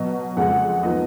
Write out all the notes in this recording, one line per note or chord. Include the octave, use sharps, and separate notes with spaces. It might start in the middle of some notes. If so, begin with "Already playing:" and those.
Already playing: B2 F#3 B3 D#5
F2 C#3 G#3 F#5
F3 B3 D#4 D#5